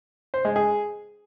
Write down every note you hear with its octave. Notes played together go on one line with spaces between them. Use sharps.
C5
G#3
G#4